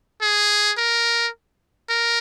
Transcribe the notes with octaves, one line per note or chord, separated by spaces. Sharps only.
G#4
A#4
A#4